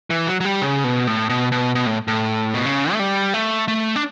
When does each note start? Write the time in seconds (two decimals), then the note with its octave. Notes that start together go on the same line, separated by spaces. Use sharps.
0.10 E3
0.27 F#3
0.40 F#3
0.45 G3
0.62 C#3
0.84 B2
1.07 A2
1.29 B2
1.52 B2
1.75 B2
1.86 A2
2.08 A2
2.54 B2
2.65 C#3
2.93 A3
2.99 G3
3.34 A3
3.68 A3
3.96 D4